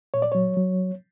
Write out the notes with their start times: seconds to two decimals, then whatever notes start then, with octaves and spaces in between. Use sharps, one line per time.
0.14 A#2 C#5
0.22 D5
0.32 F#3 C#5
0.57 F#3